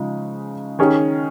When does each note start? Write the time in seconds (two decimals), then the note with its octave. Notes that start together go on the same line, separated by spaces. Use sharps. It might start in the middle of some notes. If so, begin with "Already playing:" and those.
Already playing: C#3 F3 G#3 D#4
0.79 D#3 C#4 G#4